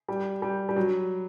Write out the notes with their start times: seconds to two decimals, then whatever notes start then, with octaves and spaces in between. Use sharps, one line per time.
0.09 G3
0.42 G3
0.69 G3
0.76 F#3